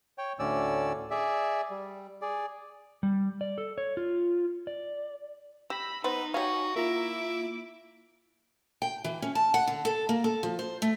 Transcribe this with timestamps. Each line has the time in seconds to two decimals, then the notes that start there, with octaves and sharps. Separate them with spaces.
0.18 C#5 G5
0.39 D2 A2 D3 C#4 D5 E6
1.11 G#4 D5 E5
1.71 G3
2.22 G#4 D5
3.03 G3
3.41 D5
3.58 A4
3.78 C#5
3.97 F4
4.67 D5
5.70 G4 B5 E6 A#6 B6
6.04 B3 D#4 B4 C5
6.34 F#4 G4 C#5 F5 G#5
6.76 A#3 E4 F4 E5 A#5 D6
8.82 G5
9.04 E3
9.22 C#4
9.35 A5
9.54 F#5
9.67 D3
9.85 A4
10.09 A#3
10.24 A4
10.43 F3
10.59 C5
10.82 A3